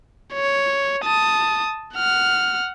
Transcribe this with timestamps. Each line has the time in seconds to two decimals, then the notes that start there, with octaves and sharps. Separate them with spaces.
0.34 C#5
1.04 A5 D#6
1.95 F#5 F6